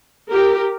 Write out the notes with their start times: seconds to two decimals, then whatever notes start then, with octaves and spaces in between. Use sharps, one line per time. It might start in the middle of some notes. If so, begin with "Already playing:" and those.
0.31 G4 A#4